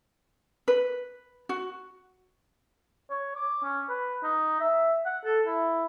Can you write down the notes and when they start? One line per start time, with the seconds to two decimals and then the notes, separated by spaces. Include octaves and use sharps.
0.68 B4
1.49 F#4
3.10 C#5
3.35 D6
3.63 C#4
3.89 B4
4.24 D#4
4.60 E5
5.06 F#5
5.25 A4
5.46 E4